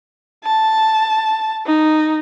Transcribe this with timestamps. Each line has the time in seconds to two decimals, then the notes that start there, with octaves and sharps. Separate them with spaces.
0.44 A5
1.66 D#4